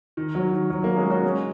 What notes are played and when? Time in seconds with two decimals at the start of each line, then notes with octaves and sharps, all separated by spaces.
0.17 D#3
0.35 F#3
0.53 D#3
0.70 F#3
0.83 F#3 A#3
0.97 G#3 C#4
1.10 C#4 F#4
1.24 G#3 C#4